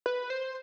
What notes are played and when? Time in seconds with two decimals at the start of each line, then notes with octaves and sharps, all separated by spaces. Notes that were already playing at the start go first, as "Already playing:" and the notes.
0.06 B4
0.30 C5